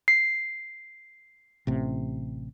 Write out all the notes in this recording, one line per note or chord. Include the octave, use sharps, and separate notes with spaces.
C7
A1 C3